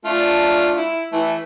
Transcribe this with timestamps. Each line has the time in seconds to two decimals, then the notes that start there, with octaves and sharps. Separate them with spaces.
0.05 A3 D4 F4
0.77 E4
1.13 E3 A3